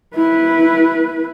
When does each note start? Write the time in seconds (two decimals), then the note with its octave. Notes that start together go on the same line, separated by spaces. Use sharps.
0.15 E4 B4